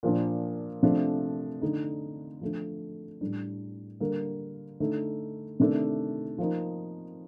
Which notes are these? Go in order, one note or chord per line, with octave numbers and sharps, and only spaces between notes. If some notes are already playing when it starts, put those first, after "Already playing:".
A#2 F3 A#3 D4
C3 F3 A3 D4
D3 A3 D#4
F3 A3 D4
A2 G3 D4
D3 G3 A#3
D3 A3 D#4
C3 D#3 A3 D4
F3 A#3 D#4